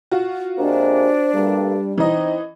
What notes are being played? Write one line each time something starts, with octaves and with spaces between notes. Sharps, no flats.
F4 F#4
C3 G#3 A#3 D4 C5
G2 G3 A3 A#3
E3 C4 D#4 D#5